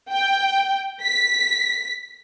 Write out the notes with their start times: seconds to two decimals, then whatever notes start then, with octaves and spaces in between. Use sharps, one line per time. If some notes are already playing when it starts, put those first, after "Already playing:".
0.11 G5
1.01 B6